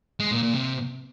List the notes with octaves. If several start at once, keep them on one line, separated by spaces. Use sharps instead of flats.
G#3
A#2
A#2
C3